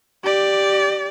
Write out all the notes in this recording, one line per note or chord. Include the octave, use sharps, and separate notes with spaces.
G4 D5